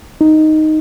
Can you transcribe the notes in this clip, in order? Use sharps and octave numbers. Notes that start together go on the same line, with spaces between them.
D#4